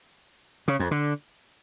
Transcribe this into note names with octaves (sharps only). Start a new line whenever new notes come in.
C#3
F2
D3